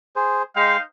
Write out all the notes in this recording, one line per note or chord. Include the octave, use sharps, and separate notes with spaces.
G#4 C5
G#3 D#4 C5 F5 G5